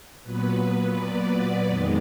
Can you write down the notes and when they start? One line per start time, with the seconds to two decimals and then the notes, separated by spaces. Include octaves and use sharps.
0.23 A#2 F#3 B3 B4
0.96 D5
1.68 F2 D#3 G#3 B3